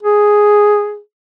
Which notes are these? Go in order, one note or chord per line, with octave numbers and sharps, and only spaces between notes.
G#4